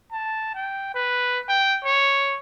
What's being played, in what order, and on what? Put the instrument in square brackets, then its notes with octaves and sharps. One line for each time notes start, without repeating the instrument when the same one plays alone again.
[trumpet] A5
G5
B4
G5
C#5